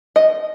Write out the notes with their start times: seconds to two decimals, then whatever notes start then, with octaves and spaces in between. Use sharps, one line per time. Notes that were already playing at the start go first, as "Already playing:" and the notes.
0.16 D#5